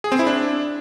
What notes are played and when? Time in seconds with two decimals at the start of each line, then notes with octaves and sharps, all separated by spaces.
0.04 G#4
0.12 C4
0.19 E4
0.27 D4